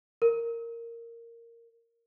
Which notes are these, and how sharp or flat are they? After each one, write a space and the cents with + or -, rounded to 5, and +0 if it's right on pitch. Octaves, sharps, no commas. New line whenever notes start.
A#4 -10